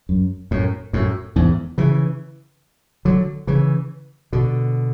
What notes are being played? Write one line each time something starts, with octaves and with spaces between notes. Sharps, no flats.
F#2
F#2 A2
F#2 A2
E2 G#2
C#3 E3
D3 F#3
C#3 E3
B2 D3